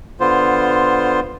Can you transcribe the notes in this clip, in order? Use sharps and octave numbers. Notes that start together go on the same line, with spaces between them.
D3 B3 F4 C5